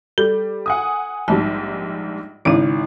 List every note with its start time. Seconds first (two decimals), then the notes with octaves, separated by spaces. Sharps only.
0.18 G3 A4
0.66 F#5 G#5 D#6
1.28 A#1 G#2 G3 A5
2.45 G#1 C#3 D#4 E4